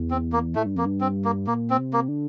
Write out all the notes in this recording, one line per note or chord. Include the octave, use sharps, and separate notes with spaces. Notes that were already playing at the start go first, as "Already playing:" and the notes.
Already playing: E2
C4
A#3
A2 A3
G2
F2 A#3
G2
C4
A#3
A#2 A#3
C4
C3
A#3
D3